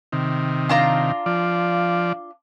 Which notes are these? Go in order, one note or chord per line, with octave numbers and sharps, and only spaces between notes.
C3 D#3
D4 F4 A#5
F3 D5